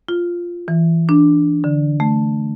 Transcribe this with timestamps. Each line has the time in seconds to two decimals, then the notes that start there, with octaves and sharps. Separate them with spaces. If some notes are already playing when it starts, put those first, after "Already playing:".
0.09 F4
0.68 E3
1.09 D4
1.64 D3
2.00 A3